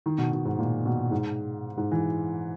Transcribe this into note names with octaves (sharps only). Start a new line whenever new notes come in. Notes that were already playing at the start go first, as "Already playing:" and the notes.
D#3
B2
B2
G#2
A#2
B2
G#2
G#2
E3